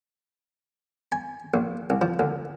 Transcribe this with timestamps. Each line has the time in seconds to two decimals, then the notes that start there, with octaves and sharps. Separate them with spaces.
1.12 G#5
1.54 A#1
1.90 C2
2.01 F3
2.19 D2